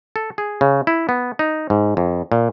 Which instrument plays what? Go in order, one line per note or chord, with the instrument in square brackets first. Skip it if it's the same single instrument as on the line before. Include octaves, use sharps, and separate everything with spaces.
[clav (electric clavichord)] A4
G#4
C#3
E4
B3
D#4
G#2
F2
A#2